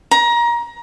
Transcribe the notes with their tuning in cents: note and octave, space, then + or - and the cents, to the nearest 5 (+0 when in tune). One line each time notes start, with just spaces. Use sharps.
A#5 +25